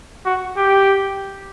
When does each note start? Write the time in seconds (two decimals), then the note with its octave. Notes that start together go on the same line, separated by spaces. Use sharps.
0.25 F#4
0.57 G4